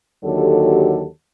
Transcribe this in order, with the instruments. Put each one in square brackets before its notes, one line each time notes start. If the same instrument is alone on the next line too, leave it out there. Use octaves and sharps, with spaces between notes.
[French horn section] D#2 D3 F#3 F#4 G4 A4